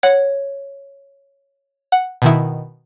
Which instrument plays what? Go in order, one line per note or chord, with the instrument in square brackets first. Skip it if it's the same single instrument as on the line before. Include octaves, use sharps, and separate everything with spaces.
[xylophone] C#5 [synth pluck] F#5
[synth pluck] F#5
B2 D#3 E4